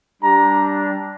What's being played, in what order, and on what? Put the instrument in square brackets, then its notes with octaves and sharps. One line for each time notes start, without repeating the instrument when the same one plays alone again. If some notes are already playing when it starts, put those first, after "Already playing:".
[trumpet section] G3 D4 G4 A#5